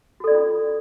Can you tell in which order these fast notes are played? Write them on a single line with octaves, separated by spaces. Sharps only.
F#4 A4 D5 C#4 F4